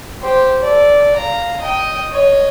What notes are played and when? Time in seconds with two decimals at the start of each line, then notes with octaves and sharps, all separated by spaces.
0.22 G4 C5
0.62 A4 D5
1.16 F5 A#5
1.61 D#5 G5
2.11 C#5 D#5